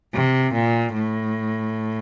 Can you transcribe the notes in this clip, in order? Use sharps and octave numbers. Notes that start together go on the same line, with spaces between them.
C3
A#2
A2